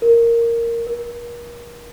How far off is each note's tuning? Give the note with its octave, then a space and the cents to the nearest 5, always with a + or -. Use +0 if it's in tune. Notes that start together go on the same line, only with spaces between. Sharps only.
A#4 -5
A#4 +40